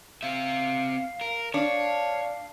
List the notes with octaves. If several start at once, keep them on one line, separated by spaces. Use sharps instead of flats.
C4 E5 F5
A#4
D4 C#5 F5